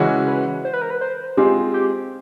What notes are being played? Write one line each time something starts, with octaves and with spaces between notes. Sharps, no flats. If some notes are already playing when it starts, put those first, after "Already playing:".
Already playing: C#3 E3 G#3 C#4 F#4
B4
C5
B4
A#4
B4
C5
G#3 C4 F4 G4 G#4
G4